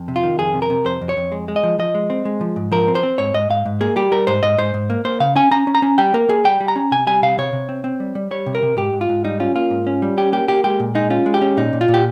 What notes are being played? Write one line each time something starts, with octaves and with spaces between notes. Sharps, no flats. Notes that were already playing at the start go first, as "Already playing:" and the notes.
Already playing: F2
C3
F4
D#3
F2 G#4
C3
A#4
C3
F2 C5
F2
C#5
F2
G#3
G#3
D#5
F3
F3 D#5
G#3
C4
G#3
F3
G#2
F3 A#4
C4
C5
C4
G#2 C#5
G#2 D#5
G#2 F5
G#2
A#3 G#4
G3 G4
G3 A#4
G#2 C5
G#2 D#5
G#2 C5
G#2
A#3
A#3 C5
C#3 F5
C#4 G#5
C#4 A#5
C#4
A#5
C#4
G3 G5
A#3 A#4
A#3 G#4
G3 G5
G3
A#5
C#4
C3 G#5
G3 G#5
C3 F5
C3 C#5
C3
C4
C4
G3
G3
G3 C#5
C3
A#4
C3
G#2 G4
G#2
F4
G#2
G3 D#4
C#4 F4
A#3 F4
G#2
C#4
G3
C#4 G4
A#3 G4
A#3 G4
G#3 G4
A#2
G#3 D#4
C#4 F4
G#3
G4
C#4
A#2 D#4
A#2
F4
A#2
G4